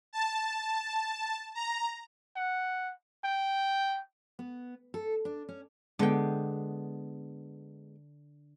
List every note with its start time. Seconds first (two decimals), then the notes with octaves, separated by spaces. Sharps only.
0.13 A5
1.55 A#5
2.36 F#5
3.24 G5
4.39 B3
4.94 A4
5.25 D4
5.49 C#4
5.99 D3 G#3 B3 G5